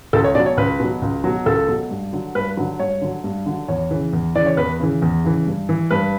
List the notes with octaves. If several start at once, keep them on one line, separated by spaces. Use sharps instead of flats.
C#2 A4
C#5
B2 F#3 D5
C#5
C#2 B4
B2 F#3
C#2
B2 F#3
C#2 A4
B2 F#3
G2
D3 F#3
G2 B4
D3 F#3
G2 C#5
D3 F#3
G2
D3 F#3
E2 C#5
C#3 E3
E2
C#3 E3 D5
C#5
E2 B4
C#3 E3
E2
C#3 E3
G2
E3
G2 B4